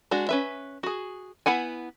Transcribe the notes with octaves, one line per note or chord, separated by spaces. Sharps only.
G#3 D4 F#4
C#4 B4 E5
F#4 G#4
B3 E4 F#5 G#5